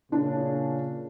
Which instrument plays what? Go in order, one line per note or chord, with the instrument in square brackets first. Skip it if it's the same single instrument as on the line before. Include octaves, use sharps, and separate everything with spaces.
[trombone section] A#2 C#3 [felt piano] D4